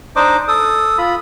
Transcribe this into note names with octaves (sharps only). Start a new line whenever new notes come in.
D4 D#4 C5 D#5 D6
A4 D#6
F4 B5